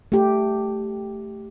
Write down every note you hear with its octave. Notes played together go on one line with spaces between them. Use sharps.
A3 G4